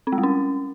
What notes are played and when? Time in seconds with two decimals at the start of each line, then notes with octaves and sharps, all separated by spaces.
0.07 C4
0.12 G#3
0.18 G3
0.23 C#4